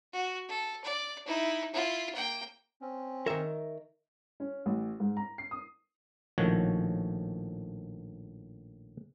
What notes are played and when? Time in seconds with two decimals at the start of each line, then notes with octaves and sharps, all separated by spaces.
0.13 F#4
0.49 A4
0.84 D5
1.26 D#4 E4
1.73 E4 F4
2.15 A#3 G5
2.81 C4 C#4
3.26 D#3 A#4 C#5 E5
4.40 C#4
4.66 A1
5.00 G#2
5.17 A#5
5.38 C7
5.51 D#6
6.38 A#1 A2 D#3 F3 F#4 C#5